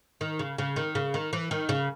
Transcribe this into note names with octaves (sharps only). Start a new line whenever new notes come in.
D#3
C#3
C#3
D#3
C#3
D#3
E3
D#3
C#3